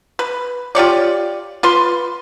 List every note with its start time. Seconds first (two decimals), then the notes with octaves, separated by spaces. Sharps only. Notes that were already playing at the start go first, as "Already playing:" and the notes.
0.19 B4
0.75 F4 G4 C#5 D5
1.63 F4 B4 C6